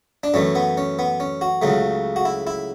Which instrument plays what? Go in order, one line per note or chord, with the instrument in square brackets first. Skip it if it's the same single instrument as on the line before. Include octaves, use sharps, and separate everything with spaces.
[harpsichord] D4
F#2 E3 A3 C#4
B3
C#4
B3
C#4
F#4
C#2 C#3 F#3 A3
F#4
E4
E4